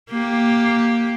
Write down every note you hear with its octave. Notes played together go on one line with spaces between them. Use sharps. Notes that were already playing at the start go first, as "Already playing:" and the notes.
A#3 G4